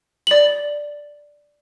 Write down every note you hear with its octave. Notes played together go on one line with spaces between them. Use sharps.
D5 F#7